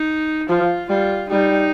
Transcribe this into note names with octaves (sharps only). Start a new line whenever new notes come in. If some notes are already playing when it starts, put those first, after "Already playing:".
Already playing: D#4
F3 F4
G3 F4
G3 D#4